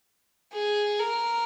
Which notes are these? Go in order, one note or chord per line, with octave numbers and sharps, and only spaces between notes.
G#4
A#4